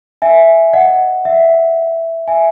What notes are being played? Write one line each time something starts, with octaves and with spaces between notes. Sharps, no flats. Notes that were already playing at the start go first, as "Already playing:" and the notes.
E5 G#5
D#5 F#5
E5
E5 G#5